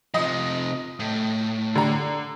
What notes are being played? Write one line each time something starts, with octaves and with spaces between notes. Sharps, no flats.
C3 F3 D#5
A2
D3 A#5